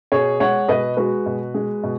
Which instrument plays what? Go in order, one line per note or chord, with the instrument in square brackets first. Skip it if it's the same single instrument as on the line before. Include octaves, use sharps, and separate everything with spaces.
[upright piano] B2 G#4 C#5
G#3 C#5 F#5
B2 B4 D#5
G#3 F#4 B4
B2
G#3
B2